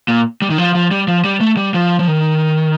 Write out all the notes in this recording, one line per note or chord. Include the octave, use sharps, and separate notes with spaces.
A#2
G3
D#3
F3
F3
G3
F3
G3
A3
G3
F3
F3
D#3